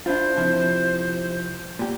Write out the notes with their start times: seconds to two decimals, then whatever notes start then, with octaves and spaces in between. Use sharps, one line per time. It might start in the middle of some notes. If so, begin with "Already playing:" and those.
0.06 D4 E4 F4 C5
0.37 C3 F3 E4
1.79 A#2 G4